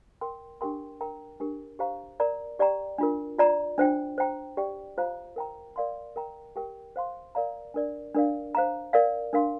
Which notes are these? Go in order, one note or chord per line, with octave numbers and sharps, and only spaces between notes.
A#4 G5 C6
D4 G4 A#4 G5 C6
A#4 G5 A#5
D4 G4 A#4
G4 C5 F5 A#5
A#4 D5 A#5
G4 D5 G5 A#5
D4 F4 A#4
F4 D5 A#5
D4 F4 C5 G5
C5 G5 A#5
G4 D5 G5
F4 C5 F5 A#5
A#4 G5 A#5
A#4 D5 F5 C6
A#4 G5 A#5
G4 A#4 G5
C5 F5 C6
A#4 D5 F5 A#5
D4 A#4 D5
D4 A#4 D5 F5
C5 F5 A#5
A#4 D5 F5
D4 A#4 F5 C6